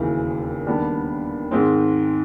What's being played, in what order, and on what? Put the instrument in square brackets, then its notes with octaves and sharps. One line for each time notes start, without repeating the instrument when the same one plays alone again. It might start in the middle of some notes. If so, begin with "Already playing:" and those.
Already playing: [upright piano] E1 D#2 C#3 E3
D#2 D3 G3 B3 D4
G#2 D#3 G#3 C4